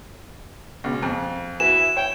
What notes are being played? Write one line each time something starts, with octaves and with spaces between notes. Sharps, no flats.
C#2 B2
F2
E4 F#4 B4 G#5 E7
C#5 G5